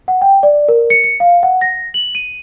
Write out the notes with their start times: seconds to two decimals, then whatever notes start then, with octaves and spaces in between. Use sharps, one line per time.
0.08 F#5
0.21 G5
0.43 D5
0.68 A#4
0.90 C#7
1.04 C#7
1.20 F5
1.43 F#5
1.61 A#6
1.94 F#7
2.15 D#7